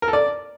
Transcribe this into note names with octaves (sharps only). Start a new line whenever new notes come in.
A#4
A4
D5